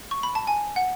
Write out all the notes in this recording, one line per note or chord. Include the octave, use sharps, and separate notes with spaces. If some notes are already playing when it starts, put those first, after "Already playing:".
C#6
B5
A5
G#5
F#5